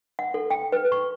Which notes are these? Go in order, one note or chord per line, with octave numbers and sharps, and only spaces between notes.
F#5
A4
G5
B4
C#6